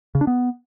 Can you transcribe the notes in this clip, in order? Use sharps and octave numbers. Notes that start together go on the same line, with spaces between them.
C#3
D4
B3